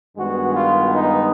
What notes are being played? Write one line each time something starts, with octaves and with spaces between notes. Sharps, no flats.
G2 D#3 G#3 B3 F#4
F4
D#4